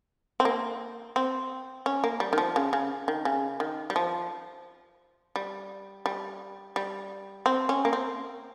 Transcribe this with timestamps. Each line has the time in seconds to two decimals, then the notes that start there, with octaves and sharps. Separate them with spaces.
0.40 C4
0.45 A#3
1.16 C4
1.86 C#4
2.04 A#3
2.20 G3
2.33 D#3
2.38 F3
2.56 C#3
2.73 C#3
3.08 D#3
3.25 C#3
3.60 D#3
3.90 G3
3.96 F3
5.36 G3
6.06 G3
6.76 G3
7.46 C4
7.69 C#4
7.85 A#3
7.93 C4